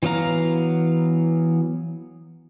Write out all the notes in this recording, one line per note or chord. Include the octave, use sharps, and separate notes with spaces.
E3 F#3 B3 F5 A#5